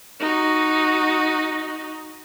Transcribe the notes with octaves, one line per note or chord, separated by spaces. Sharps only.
D#4 F#4